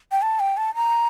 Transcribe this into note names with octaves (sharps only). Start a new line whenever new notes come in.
G5
A5
G5
A5
A#5